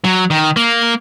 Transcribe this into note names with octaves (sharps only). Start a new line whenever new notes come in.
F#3
D#3
A#3